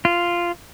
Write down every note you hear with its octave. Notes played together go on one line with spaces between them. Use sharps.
F4